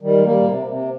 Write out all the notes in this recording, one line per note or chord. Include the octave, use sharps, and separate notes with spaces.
D#3 G3
G#3
G3 A#3
A#2
C3
C3